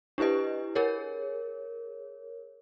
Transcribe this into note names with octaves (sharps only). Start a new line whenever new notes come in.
D4 E4 G4 B4 D#5
G#4 A#4 C#5